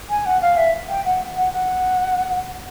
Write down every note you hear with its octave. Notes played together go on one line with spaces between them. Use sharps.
G#5
F#5
F5
E5
G5
F#5
F#5
F#5